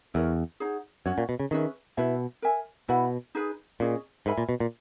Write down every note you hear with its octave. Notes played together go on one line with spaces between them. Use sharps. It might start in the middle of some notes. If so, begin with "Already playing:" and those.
E2 E4 A#4 C#5
D#4 G#4 C#5 F#5
F#2 C#4 F#4 C#5
A#2
B2
C#3
D#3 C#4 G#4 B4 E5
B2 E4 B4 E5
A#4 E5 G#5
B2 E4 B4 F#5 B5
D#4 G#4 B4
A#2 C#4 G#4 D#5
G#2 A#4 E5 G#5 B5
A#2
B2
A#2